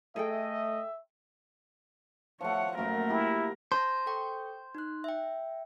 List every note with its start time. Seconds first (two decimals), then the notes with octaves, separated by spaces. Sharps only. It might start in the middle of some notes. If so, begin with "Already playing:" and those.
0.16 A3 G#4 A4 D#5 E5 G5
2.41 F3 A3 C#5 F#5
2.78 F#2 A#2 A3 A#4 B5
3.10 E4 G4
3.72 C5 A5 A#6
4.06 A4 G5 C#6
4.75 D#4 F#6
5.04 E5 G5